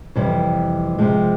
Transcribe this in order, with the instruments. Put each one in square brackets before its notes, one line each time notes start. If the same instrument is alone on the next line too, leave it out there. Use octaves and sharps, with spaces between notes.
[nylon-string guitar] F2 C3 E3 G3
C3 F3 G#3